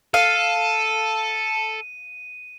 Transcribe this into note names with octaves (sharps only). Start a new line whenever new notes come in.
A4 F5 D#7